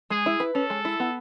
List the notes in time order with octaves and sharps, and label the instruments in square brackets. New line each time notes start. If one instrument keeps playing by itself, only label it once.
[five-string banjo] G#3 [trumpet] G#4
[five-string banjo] E4
B4
[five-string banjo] C#4 [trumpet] A4
[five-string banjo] G#3
E4
B3